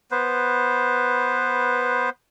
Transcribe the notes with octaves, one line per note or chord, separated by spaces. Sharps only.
B3 B4 C5